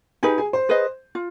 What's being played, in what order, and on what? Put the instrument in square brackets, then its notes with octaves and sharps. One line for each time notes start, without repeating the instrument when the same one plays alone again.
[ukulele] D#4 G4 B4 [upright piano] G#4 G#5
[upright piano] G#4 G#5
C5 C6
[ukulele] G#4 B4 D#5
F4